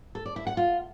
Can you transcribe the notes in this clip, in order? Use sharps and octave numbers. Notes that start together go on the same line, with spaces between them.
A4
D5
E4
F#5
F4